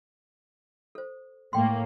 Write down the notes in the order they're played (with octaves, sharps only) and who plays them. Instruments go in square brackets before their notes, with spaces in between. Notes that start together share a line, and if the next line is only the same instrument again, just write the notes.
[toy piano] A4 C5
[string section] A2 A#3 [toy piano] G5 C6